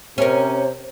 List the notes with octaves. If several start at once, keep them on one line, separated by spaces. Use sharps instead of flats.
C3 C#4 A#4 C5